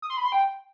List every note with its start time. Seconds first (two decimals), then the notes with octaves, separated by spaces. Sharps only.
0.02 D#6
0.10 C6
0.17 B5
0.25 C6
0.32 G5